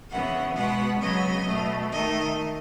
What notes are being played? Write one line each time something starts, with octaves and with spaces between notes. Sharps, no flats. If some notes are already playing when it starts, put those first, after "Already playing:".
C#3 E3 B3 F#5
B2 G#3 B3 F#5
C#3 F#3 B3 D#5
B2 A3
D#3 A3 D#5